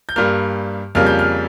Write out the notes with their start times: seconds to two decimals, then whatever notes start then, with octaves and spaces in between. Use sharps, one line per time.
0.09 G6
0.16 G2 G3 A#3 F6
0.95 F2 C#3 G3 A#3 F6
1.07 G6
1.19 F6